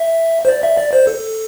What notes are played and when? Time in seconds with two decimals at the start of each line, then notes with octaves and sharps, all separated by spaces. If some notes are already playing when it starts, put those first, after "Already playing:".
Already playing: E5
0.45 C5
0.48 D5
0.63 E5
0.77 D5
0.93 C5
1.07 A4